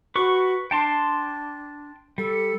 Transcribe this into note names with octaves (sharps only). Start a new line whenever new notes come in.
F#4 B4 C#6
D4 G5 A5 C6
G3 A4